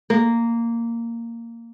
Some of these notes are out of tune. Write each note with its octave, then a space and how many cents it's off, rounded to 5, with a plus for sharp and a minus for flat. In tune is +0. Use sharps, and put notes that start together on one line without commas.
A#3 -10